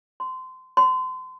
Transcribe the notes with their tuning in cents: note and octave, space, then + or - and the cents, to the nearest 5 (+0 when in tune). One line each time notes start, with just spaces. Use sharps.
C6 -25
C6 -35